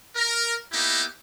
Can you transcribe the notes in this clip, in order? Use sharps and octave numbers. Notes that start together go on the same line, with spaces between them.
A#4
A#3 B3 D#4 E4 G4